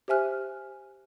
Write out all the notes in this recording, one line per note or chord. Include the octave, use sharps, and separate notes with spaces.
G4 C5 E5 G#5 F6 F#6